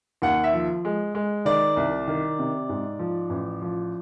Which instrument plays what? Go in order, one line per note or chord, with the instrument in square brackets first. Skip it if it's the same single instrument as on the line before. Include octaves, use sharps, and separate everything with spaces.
[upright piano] D#2 F#5
E5
F3
G#3
G#3
D#3 D5
C2
D#3
C3
G#2
F3
A1
F3